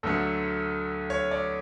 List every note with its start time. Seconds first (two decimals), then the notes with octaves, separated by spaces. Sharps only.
0.03 D2 D3 F#3 A3 A4
1.10 C#5
1.31 D5